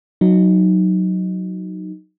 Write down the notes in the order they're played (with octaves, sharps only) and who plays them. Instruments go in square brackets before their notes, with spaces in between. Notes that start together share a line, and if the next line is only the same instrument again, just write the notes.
[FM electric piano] F#3 D#4